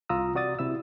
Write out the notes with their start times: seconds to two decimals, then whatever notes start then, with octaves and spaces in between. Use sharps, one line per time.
0.09 C2 F4 A#5 D#6 E6
0.35 C3 F#4 D5 D#6 A6
0.59 C3 E4 E5 E6